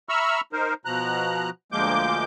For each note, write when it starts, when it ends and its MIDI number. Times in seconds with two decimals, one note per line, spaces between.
0.09 0.41 76
0.09 0.41 82
0.09 0.41 83
0.09 0.41 85
0.09 0.41 88
0.09 0.41 89
0.53 0.74 63
0.53 0.74 70
0.53 0.74 72
0.85 1.50 47
0.85 1.50 53
0.85 1.50 82
0.85 1.50 90
1.72 2.24 38
1.72 2.24 53
1.72 2.24 56
1.72 2.24 58
1.72 2.24 86
1.72 2.24 91